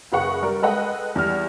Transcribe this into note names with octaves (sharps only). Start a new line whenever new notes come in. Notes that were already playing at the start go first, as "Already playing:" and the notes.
F#1 G#4 B4 F#5 C#6 C#7
G3 A#4 D5
G#3 A4 B4 D#5 F#5 G5
E2 G3 F6